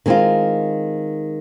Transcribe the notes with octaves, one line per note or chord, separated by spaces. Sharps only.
D#3 G#3 C4 F4